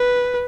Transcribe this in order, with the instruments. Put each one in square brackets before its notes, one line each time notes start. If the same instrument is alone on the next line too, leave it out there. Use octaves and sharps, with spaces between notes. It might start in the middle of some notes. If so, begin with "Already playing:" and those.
Already playing: [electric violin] B4